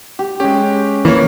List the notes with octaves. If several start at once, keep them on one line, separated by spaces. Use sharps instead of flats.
G4
G#3 C#4 G4
E3 A#3 C#5